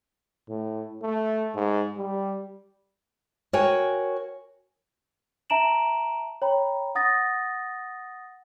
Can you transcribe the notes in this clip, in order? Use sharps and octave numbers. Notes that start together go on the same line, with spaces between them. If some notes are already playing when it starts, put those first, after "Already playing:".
A2
A3
G#2
G3
F#4 A#4 C#5 G5 G#5
E5 A5 A#5 D7 E7 F#7
C#5 G5 A#5 B5
F#5 D#6 A6 A#6